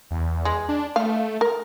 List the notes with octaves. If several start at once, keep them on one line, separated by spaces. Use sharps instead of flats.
E2
G#3
D4
A3 F5
A#4